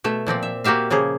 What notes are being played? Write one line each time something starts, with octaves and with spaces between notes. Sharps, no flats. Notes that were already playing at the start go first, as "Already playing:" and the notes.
B2 A3 E5
A#2 F3 C4 D5
E5
A#3 F#4 G4 E5 F5
C#3 F3 A#3 G#4